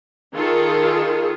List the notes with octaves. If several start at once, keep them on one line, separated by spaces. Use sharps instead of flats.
D#3 F4 G#4 A4